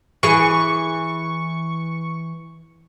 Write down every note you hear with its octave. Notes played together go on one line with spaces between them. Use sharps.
E3 G#4 C#6